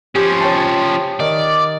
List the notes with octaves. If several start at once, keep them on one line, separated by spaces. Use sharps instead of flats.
F3 C#4 G4
C#5 G5 A5
D#3 D5